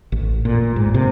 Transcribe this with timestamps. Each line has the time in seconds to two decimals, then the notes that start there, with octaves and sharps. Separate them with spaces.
0.12 A1
0.45 A#2
0.76 G#2
0.94 C3